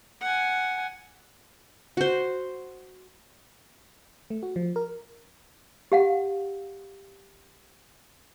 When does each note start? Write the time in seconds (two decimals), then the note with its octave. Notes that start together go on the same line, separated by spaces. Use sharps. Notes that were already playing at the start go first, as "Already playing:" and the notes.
0.21 F#5 G#5
1.97 F#4 C5
4.30 A3
4.43 F#4
4.56 F3
4.76 A#4
5.92 G4 F5 F#5